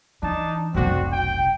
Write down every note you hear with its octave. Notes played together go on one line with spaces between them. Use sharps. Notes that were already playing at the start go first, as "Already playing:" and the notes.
E3 D4 D#4 A5
F1 B1 C4 D4 F#4
G5